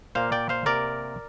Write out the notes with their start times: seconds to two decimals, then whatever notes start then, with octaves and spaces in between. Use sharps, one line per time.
0.15 A#2 A#3 C5 F5
0.32 D5 G5
0.49 C5 F5
0.66 C3 A#3 A#4 D5